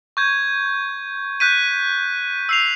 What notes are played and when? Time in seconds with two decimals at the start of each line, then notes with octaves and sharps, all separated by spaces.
0.17 C#6 G6 G#6
1.40 F#6 G6 B6 D#7
2.49 E6 C7 F7